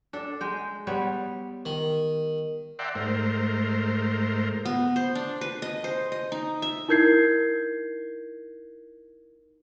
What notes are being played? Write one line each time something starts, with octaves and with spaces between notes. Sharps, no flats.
D4 A4
G#3 G5
G3 B3 C#5
D#3
D5 E5 F#5 G5 A#5 C6
G#2 A3 A#4 C5
B3
C5
D4
B4
D#5
C5
D#5
D#4
E5
D#4 E4 A#4 G6 G#6 C7